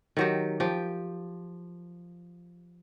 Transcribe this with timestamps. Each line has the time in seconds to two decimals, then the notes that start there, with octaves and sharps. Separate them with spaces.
0.17 D#3 F#3 G4
0.60 F3 G4